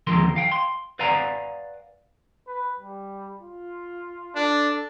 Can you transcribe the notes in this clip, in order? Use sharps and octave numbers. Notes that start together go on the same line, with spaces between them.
D#2 D3 F3 G#3 A#4 C6
F5 G5
C6
B4 D5 F5 F#5 G#5 A#5
B4
G3
F4
D4 A4